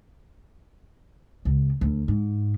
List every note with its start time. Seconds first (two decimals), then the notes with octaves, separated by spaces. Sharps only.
1.45 C#2
1.81 D2
2.08 G#2